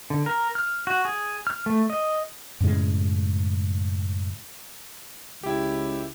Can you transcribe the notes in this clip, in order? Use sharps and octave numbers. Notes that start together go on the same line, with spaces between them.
D3
A#4
F6
F#4
G#4
F6
A3
D#5
F#2 A2 C#3 G#3
C#2 E4 G4